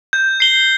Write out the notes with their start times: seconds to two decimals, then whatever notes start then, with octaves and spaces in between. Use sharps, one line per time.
0.13 G6
0.40 C7 G7